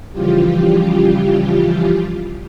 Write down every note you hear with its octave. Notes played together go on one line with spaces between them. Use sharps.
C#3 E3 F3 G3 F4 G4